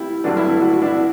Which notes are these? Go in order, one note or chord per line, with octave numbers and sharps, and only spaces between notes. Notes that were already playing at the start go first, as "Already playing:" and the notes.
Already playing: G3 E4 G4
G2 D3 F#3 D4
E4
E4
F#4
F#4
D4
E4